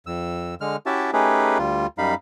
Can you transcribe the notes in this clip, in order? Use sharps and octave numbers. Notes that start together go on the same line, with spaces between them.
F2 E6
D3 G#3 F6
C#4 E4 F#4 G4 E5 A5
A3 C#4 D#4 G4 G#4 B4
D2 G3 F4
F#2 G3 D#4 F5 B5